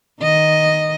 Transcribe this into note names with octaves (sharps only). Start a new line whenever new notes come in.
D#3 D#5